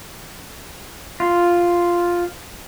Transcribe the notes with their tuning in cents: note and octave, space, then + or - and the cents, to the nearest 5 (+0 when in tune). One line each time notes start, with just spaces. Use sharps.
F4 +0